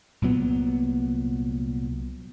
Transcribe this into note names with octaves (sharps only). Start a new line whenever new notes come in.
C2 A#2 F#3 B3